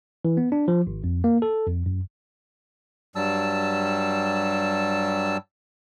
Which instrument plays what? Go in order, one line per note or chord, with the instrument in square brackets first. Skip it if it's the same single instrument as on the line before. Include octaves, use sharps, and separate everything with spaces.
[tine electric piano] E3
B3
D4
F3
G#1
F2
A#3
A4
F2
F#2
[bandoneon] G2 F#3 G3 A5 E6